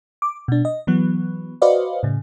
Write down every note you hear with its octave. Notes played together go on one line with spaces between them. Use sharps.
D6
B2 D4
D#5
E3 F#3 B3
F#4 B4 C5 D5 D#5 F5
A2 C#3